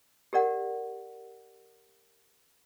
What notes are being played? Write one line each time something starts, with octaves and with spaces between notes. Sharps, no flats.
G4 A#4 D5 F#5